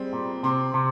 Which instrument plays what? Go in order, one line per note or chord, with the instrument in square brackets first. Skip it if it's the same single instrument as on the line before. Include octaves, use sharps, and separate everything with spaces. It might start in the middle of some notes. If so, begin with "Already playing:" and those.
Already playing: [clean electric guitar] G3 [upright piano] G#3 C4
[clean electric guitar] A#2
[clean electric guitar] C3 [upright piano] C4
[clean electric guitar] C3